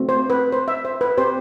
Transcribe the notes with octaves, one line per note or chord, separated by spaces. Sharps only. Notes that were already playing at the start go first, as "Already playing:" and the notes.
Already playing: A3 C4 F#4
C5
B4
C5
E5
C5
B4
C4 G4 C5